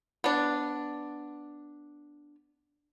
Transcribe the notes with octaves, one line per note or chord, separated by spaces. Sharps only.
B3 D4